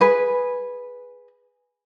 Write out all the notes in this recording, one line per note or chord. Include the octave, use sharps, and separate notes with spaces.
G#4 B4